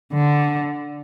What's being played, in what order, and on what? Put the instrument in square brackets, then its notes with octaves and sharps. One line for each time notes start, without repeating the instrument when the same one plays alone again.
[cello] D3